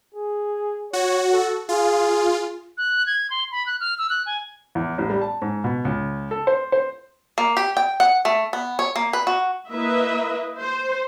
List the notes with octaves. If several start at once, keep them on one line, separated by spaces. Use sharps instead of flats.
G#4
F#4 C#5
A4
F4 G#4
F#6
G#6
C6
B5
F#6
F6
E6
F#6
G#5
E2
A1
G3
A5
G#2
B2
C#2
A4
C5
C5
A#3
G4
G5
F#5
A3
B3
C#5
A#3
B4
F#4
A#3 E4 B4 D#5 E5
C5